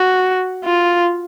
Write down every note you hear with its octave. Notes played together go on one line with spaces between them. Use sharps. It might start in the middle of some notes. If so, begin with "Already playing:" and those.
Already playing: F#4
F4